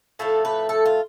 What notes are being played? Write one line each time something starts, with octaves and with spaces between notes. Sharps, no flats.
A2 F3 A3 A4
B4
A4
F4